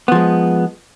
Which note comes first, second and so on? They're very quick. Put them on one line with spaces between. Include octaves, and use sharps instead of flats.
B3 F3 G#3